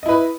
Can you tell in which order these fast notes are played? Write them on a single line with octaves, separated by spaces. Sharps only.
D#5 E4 B4